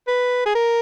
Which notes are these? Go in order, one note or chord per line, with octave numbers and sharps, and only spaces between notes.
B4
G#4
A#4